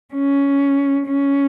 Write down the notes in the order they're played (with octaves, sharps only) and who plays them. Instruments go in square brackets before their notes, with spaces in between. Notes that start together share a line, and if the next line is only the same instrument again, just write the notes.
[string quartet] C#4
C#4